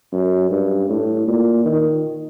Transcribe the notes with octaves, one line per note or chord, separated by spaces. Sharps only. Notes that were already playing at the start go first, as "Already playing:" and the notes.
F#2
G2
A2
A#2
D#3